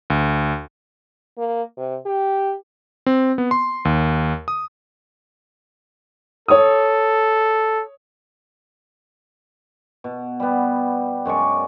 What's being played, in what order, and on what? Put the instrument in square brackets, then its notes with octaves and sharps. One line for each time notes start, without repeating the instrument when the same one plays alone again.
[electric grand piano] D2
[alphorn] A#3
C3
G4
[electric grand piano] C4
B3
C6
D#2
D#6
[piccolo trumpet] A4 [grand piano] C#5 D#6
[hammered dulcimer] B2
G3 B3
F#2 G#3 D5 C#6